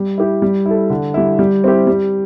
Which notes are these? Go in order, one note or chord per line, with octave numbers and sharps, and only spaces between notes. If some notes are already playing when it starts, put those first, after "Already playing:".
Already playing: G3
E4 G4
G3
E4 A4
D3
G3 E4
G3
C4 E4 G4
G3